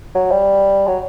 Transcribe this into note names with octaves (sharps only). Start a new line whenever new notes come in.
F#3
G3
F#3